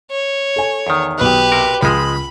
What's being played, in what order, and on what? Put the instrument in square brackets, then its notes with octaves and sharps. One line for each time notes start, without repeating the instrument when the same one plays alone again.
[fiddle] C#5
[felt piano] A4 G#5
[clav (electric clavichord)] E2 D#3
[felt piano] B1 F#6 [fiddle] G4 B4
[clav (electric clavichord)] C3 A#4
[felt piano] C#2 [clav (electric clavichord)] F3 G#3 [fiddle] B5